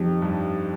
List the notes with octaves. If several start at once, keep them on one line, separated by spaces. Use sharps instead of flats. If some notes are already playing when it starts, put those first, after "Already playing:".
Already playing: F2 F3 C4 D#4 G4
G2